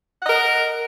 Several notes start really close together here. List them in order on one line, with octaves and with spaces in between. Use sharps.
F#5 D#5 A#4